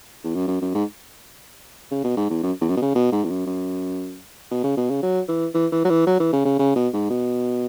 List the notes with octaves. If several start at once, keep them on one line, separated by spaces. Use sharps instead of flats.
E2
F#2
F#2
F#2
G#2
C#3
B2
G#2
E2
F#2
E2
F#2
B2
C#3
B2
G#2
E2
F#2
F#2
B2
C#3
B2
C#3
F#3
E3
E3
E3
F#3
E3
F#3
E3
C#3
C#3
C#3
B2
G#2
B2